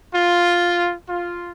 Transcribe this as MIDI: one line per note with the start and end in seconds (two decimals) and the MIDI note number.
0.15 0.94 65
1.09 1.51 65